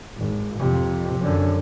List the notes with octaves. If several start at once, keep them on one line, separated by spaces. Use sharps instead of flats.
G#1
F2 C3
F#2 D3